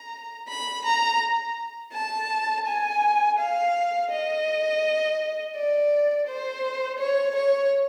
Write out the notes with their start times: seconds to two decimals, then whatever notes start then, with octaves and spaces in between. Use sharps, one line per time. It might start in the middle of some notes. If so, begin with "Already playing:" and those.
Already playing: A#5
0.49 B5
0.85 A#5
1.93 A5
2.66 G#5
3.39 F5
4.11 D#5
5.56 D5
6.27 C5
6.99 C#5
7.36 C#5